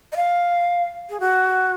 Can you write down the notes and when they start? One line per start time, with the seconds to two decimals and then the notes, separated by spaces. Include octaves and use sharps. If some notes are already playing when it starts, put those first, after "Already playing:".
0.12 D#5
0.16 F5
1.10 G#4
1.20 F#4